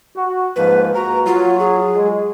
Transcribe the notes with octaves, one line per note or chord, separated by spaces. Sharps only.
F#4
G#2 F3 A#3 B4
A#3 F#4 A#5
F#3 F4
G#4
G#3